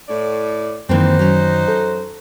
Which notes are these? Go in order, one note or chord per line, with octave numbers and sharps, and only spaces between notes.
A2 D5
F#2 D#3 E3 A#3 C4 D#4 F#4 C5
F#3 C#4
A4